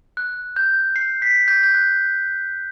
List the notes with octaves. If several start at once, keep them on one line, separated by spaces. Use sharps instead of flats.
F#6
G6
C7
B6
G6
G6
F#6